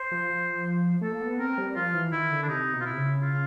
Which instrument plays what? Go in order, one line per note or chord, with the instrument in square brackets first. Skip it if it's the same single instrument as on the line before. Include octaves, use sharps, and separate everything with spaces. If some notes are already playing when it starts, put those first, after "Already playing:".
Already playing: [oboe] C5
[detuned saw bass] F3
F3
[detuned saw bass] A3 [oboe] A4
[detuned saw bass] A#3
B3
[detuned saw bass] C4 [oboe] A#4
[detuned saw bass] G3
[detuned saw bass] F3 [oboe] F4
[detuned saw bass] E3
[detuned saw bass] D#3 [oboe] E4
[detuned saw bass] D3
[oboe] D4
[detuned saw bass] C3 [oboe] D#4
[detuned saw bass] B2
[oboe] F4
E4
[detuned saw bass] C3
C#3
[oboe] F4